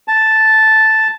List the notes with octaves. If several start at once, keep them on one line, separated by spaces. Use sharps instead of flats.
A5